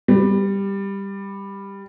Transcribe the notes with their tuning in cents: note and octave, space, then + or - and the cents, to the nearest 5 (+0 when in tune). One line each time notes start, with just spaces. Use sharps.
G3 +10